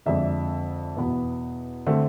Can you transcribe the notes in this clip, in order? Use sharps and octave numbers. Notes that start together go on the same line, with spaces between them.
F2 D3 G#3 D4 E5
E2 B2 B3
D3 A3 C4